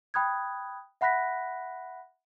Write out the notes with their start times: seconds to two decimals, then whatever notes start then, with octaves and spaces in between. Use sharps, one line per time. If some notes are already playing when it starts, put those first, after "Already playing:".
0.14 G5 B5 D#6 F#6 G#6
1.01 E5 F#5 B5 F#6 A#6 B6